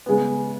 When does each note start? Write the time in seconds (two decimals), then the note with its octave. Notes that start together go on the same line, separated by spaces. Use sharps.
0.06 C#3 G#3 B3